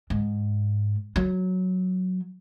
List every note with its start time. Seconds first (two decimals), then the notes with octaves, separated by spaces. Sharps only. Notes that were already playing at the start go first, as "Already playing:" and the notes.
0.10 G#2
1.16 F#3